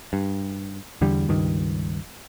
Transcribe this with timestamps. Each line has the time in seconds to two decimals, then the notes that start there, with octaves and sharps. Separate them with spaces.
0.13 G2
1.01 E2 D3 G3
1.28 C#2 G2 D#3